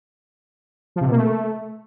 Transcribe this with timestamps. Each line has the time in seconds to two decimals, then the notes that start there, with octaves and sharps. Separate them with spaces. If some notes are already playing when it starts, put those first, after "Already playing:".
0.96 F3
1.01 C3
1.06 B2
1.11 A#3
1.16 A3